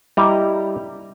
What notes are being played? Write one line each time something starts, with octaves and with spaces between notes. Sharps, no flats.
G3 E4 D#5 A#5